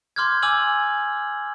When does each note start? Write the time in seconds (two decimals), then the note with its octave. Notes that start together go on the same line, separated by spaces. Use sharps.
0.16 C6 D6 F6 G6 G#6
0.42 G#5 D6 E6 F6 F#7